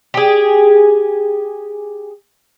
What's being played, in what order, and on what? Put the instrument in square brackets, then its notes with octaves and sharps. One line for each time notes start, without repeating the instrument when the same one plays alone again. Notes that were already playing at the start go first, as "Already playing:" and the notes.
[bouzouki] G4 G#4